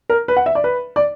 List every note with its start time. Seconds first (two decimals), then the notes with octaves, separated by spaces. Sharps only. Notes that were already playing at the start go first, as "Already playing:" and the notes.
0.10 A#4
0.28 B4
0.37 F#5
0.46 E5
0.55 D5
0.64 B4
0.96 D5